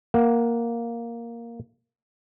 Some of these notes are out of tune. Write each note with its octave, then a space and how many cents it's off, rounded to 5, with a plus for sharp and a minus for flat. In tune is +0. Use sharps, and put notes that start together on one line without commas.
A#3 +0 F#5 +0